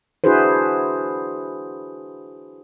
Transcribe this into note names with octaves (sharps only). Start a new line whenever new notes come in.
D4 E4 F#4 G#4 B4 C5